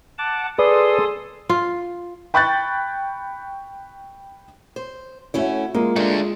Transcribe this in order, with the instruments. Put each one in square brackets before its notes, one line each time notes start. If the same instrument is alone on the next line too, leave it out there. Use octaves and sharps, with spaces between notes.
[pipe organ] F#5 A5 D6
[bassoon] G#4 [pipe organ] A4 C6 D#6 [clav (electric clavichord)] B4 D5
[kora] F4
[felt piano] G5 B5 C#6 F#6 G6 A6
[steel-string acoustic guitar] C5
[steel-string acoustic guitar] A3 C#4 E4 [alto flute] F#4 [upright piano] C#5 E5
[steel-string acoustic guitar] G#3 [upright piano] A#3 [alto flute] F4
[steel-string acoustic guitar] G#3 [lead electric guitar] A3 D4